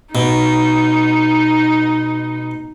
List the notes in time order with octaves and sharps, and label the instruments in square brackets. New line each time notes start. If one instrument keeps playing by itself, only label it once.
[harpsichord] B2 [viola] D#4